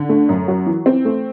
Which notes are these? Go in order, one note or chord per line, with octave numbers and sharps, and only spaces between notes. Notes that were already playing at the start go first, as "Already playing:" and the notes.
Already playing: D3
A3
F#2
F#3
E3
C4
A3